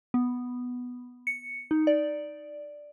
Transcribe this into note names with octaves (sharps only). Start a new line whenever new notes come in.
B3
C#7
D#4
D5